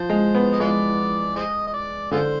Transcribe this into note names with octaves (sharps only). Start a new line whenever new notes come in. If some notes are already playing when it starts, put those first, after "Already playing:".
Already playing: F3 C5
G#3
B3
D#5
G#3 F4 B4 D5
G#4 C5 D#5
D#5
D5
D3 F4 G#4 C5